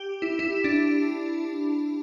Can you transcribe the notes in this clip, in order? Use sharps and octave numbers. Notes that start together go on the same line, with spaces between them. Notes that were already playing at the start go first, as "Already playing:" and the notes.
Already playing: G4
E4
E4
D4